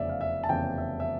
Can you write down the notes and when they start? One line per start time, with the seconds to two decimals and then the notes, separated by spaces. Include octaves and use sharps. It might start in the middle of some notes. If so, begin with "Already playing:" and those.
Already playing: F1 E2 C#3 D5 E5
0.09 F5
0.21 E5
0.44 A5
0.49 F1 E2 C#3 G5
0.78 E5
1.00 E5